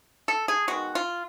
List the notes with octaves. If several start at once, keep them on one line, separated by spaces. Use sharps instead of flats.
A4
G#4
D#3 G#3 B3 F#4
F4